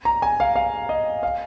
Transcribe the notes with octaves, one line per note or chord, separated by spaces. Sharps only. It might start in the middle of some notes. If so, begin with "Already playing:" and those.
A#5
G#5
F5
F5
D#5
F5